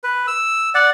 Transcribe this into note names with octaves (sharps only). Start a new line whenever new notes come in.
B4
E6
D5 F#5